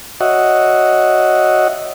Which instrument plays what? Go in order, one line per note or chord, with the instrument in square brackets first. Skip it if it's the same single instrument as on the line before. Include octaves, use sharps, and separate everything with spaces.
[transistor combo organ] F#4 C#5 D#5 E5 F#5